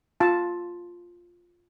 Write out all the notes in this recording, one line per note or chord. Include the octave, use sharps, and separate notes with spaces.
F4 A5